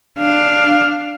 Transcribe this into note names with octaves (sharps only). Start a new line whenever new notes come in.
D4 F5